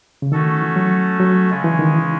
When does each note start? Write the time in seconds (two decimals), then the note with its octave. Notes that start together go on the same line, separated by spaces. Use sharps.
0.22 C#3
0.32 D#3 A3 C#4 F#4 A4
0.62 E3
0.76 F#3
1.20 F#3
1.50 C#3 G#3 C#4
1.64 E3
1.79 D#3
1.94 E3